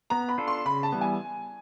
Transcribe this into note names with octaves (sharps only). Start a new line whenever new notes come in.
B3 A#5
B5
D4 F4 A4
C6
C#3 B5
A5
E3 G3 B3
G#5